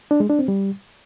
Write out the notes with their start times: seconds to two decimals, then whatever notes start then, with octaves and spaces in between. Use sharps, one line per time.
0.11 D4
0.20 G#3
0.30 D4
0.39 C4
0.48 G3